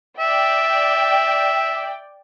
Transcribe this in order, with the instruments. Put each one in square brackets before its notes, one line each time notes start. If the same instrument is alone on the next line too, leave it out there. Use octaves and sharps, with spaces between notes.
[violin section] D5 G5 [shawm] E5